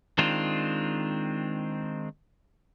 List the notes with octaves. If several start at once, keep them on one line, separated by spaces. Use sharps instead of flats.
D#3 G#3 C4 D4 F4